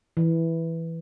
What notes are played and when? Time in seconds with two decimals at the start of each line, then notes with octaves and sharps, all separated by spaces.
0.17 E3